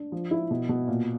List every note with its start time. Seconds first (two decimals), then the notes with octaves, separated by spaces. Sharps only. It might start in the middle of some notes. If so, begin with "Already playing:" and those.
Already playing: D4
0.12 F3
0.31 E4
0.51 B2
0.69 B2
0.88 A#2